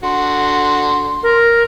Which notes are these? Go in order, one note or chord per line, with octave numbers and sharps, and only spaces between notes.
D3 F#4 C6
A#4